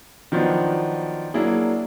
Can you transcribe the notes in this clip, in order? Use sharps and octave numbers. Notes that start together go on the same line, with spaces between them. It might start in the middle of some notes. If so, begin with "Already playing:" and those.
D#3 F3 F#3 B3 D4
F#3 A#3 D4 E4 G#4